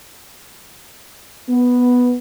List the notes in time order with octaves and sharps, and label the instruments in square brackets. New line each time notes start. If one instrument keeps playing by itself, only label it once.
[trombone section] B3